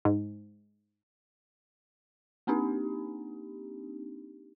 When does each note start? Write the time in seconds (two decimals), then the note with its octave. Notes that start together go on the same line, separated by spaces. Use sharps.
0.05 G#2
2.47 A#3 C4 D4 D#4 G4